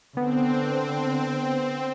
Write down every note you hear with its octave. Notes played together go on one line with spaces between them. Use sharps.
D3 B3 C4